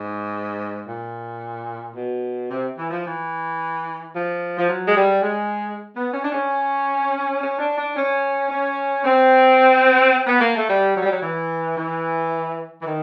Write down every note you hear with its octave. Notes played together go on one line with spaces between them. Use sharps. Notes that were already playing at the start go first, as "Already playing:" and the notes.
Already playing: G#2
A#2
B2
C3
E3
F3
E3
F3
F3
F#3
G#3
G3
G#3
B3
C#4
D4
C#4
C#4
D4
D4
C#4
C#4
C4
B3
A#3
A3
G3
F#3
G3
F#3
E3
E3
E3
D#3